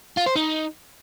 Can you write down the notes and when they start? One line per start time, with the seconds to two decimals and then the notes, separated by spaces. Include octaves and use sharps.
0.17 F4
0.26 C5
0.36 D#4